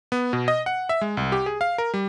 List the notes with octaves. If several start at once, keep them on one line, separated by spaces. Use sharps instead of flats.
B3
B2
D#5
F#5
E5
G#3
C2
G4
G#4
F5
A#4
G3